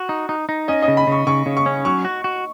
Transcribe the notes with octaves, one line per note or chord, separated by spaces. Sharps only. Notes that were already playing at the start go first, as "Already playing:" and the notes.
Already playing: F#4
D#4
D#4
D#4
C#4 D#5
D#5
C#3
B5
C#3 C#6
C#3 C#6
C#3
C#6
C#4
F#3 C#6
F#4
F#4